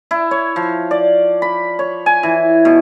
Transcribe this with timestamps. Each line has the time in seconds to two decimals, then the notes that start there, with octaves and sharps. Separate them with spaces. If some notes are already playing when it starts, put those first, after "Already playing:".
0.11 E4
0.31 C#5
0.56 F3
0.91 D5
1.42 B5
1.79 C#5
2.06 G#5
2.23 E3
2.65 B2